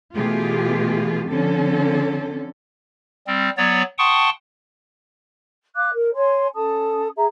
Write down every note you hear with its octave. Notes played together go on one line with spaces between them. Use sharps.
B2 E3 A3 F4 G4 G#4
D3 F3 C4 C#4 A4
G3 C4
F#3 B3 C#5 D5
F#5 G5 A5 C6 C#6 D#6
F5 D6 F#6
A#4
C#5 G#5 C6
C#4 A4 A5 D#6
G#4 E5 A#5